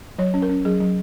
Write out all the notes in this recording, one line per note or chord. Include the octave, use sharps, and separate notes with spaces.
F#3 C#5
C#4
A#4
C#4
F#3 G#4
F#3